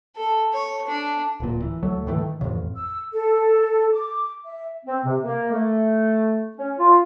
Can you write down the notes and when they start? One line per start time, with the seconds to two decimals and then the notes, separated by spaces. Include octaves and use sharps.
0.16 A4
0.53 C#5
0.88 D4
1.40 D1 A#2
1.62 E3
1.82 D2 F#3 A3
2.06 G#2 D#3 E3 A3
2.18 D#3
2.41 A1 F2 C#3
2.75 E6
3.13 A4
3.93 D6
4.44 E5
4.86 C4
5.04 C3
5.22 A#3
5.51 A3
6.57 C#4
6.79 F4